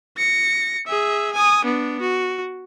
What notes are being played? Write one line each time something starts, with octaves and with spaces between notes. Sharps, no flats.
A#6 C#7
G#4 E5
G#5 D#6
B3 D4
F#4